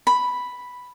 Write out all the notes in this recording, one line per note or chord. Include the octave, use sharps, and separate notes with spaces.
B5